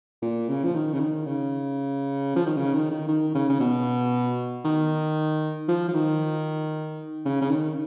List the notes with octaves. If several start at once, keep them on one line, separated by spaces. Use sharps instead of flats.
A#2
C#3
F3
D#3
C#3
D#3
C#3
F3
D#3
C#3
D#3
D#3
D#3
C#3
C#3
B2
D#3
F3
F3
D#3
C#3
C#3
D#3